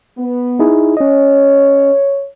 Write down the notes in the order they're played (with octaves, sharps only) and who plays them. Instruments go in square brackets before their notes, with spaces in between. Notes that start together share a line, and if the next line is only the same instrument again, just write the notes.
[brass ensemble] B3
[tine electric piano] D#4 E4 G#4
[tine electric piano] C#4 D#5 [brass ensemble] C#5